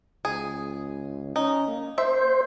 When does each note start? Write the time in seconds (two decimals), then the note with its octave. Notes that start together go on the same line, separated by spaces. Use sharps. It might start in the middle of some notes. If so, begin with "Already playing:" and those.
0.25 C#2 G#4
1.36 C#4 D#4
1.67 A#3
1.98 C5 E5